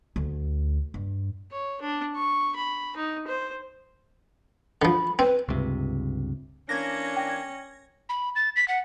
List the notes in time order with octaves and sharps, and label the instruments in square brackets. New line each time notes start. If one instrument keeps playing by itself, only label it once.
[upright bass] D2
G2
[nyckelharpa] C#5
D4
C#6
B5
D#4
C5
[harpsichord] D3 F3 [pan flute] B5
[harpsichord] C4 [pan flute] B4
[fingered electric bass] C#2 G2 C3
[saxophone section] E3 A#3 D4 [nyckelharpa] C#4 [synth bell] G#6 A#6
[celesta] G5
[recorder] B5
A6
B6
F#5